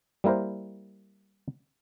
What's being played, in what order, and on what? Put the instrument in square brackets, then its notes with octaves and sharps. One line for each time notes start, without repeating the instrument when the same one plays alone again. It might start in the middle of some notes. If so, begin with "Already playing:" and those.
[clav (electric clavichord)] G3 A#3 E4 A#4 C5